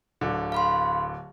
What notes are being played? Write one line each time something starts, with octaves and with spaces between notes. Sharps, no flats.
D1 D3
F5 B5 C6